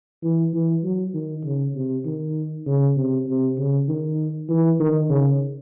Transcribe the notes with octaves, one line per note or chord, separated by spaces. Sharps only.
E3
E3
F#3
D#3
C#3
C3
D#3
C#3
C3
C3
C#3
D#3
E3
D#3
C#3